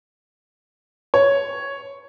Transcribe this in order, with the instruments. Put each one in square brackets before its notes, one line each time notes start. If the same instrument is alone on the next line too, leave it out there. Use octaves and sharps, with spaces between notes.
[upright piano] C#5